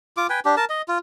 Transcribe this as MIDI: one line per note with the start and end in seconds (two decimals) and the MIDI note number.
0.17 0.27 65
0.17 0.27 86
0.30 0.40 71
0.30 0.40 79
0.30 0.40 80
0.45 0.55 62
0.45 0.55 67
0.57 0.65 70
0.57 0.65 81
0.70 0.82 75
0.88 0.98 65